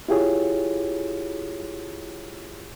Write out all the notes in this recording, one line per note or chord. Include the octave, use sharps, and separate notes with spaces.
E4 F4 G4 G#4 C#5